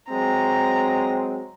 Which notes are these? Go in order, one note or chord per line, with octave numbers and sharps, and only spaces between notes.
F#3 G#3 C4 A#5